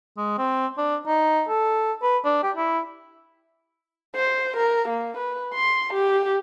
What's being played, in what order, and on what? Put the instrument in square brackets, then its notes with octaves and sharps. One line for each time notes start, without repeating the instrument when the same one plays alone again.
[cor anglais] G#3
C4
D4
D#4
A4
B4
D4
G4
E4
[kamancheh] C5
A#4
A#3
B4
C6
G4